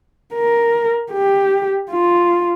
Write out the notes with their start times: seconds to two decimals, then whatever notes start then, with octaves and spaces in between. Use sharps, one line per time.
0.34 A#4
1.13 G4
1.91 F4